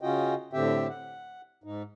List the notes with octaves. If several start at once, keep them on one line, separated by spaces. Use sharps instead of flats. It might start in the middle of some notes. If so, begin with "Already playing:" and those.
C#3 C#4 F4 F#4 D#5 G5
A2 D3 C4 G4 E5 G5
F#5
G#2 D#4